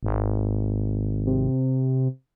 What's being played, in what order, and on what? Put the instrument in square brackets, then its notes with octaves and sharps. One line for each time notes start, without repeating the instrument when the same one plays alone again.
[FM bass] G#1
[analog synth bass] C3